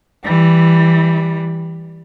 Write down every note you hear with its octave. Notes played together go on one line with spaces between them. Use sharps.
E3 G3